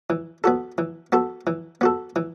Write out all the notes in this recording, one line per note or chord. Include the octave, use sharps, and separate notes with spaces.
E3
B3 F#4 A4
E3
B3 F#4 A4
E3
B3 F#4 A4
E3